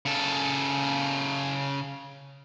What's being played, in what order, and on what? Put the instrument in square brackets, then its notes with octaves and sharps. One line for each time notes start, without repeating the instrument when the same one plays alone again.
[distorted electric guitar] C#3 A4